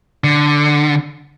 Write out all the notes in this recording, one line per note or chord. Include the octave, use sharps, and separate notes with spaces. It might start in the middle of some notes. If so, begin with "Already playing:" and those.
D3